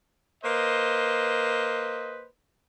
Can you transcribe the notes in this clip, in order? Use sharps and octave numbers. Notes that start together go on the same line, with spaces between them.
A#3 B4 C5 D#5